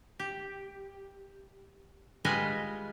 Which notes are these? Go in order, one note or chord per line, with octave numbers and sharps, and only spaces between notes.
G4
G3 G#3 F4 B4 D#5 G#5